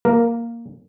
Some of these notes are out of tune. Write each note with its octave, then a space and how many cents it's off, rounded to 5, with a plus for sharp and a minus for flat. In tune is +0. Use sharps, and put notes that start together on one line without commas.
A#3 +0 A#4 +0